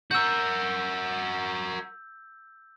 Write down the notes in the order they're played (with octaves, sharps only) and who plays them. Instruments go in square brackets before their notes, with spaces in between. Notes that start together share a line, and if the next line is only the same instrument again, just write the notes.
[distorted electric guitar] F#4 A#4 [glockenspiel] E6 G6